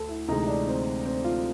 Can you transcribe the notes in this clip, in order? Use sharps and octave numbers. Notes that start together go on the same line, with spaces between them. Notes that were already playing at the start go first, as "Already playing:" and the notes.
Already playing: D2 A4
E4
D2 C3 E3 G#3 D#4
D4
C4
C4
F4